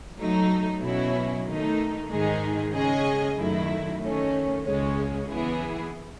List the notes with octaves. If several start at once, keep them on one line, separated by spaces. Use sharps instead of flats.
F#3 A3 D#4
B2 F#3 C#4 E4
D#3 A3 D#4
G#2 D#3 G#3 D#4 G#4
C#3 G#3 C#4 G#4 D#5
F#2 D#3 F#3 A3 E4
D#3 A3 C#4
C#2 C#3 G#3 C#4
E3 B3 E4 G#4